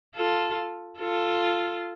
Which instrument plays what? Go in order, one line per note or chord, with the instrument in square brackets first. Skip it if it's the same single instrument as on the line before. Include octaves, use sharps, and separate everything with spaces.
[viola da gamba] F4 A4
F4 A4